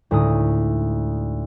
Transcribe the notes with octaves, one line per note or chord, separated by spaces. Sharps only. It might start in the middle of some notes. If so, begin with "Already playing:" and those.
D2 A2 G#3 A3 D#4 D#6